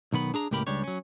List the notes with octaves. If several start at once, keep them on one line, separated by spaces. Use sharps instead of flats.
B1 D#3 B3 B5
D4 G#4 A#5
C#2 A2 A#3 G4 A#4 B5
C#2 G3 D4 G4 C#5
F#3 C#4